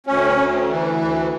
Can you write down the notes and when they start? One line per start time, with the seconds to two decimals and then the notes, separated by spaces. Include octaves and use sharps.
0.07 D2 C#4
0.38 D2
0.70 E3
1.01 D2